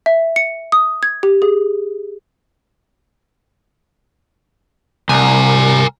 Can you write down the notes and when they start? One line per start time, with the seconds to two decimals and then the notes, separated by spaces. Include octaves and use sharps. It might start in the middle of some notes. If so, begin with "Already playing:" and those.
0.06 E5
0.36 C#7
0.72 D#6
1.03 G#6
1.23 G4
1.42 G#4
5.09 C2 A#4 G#5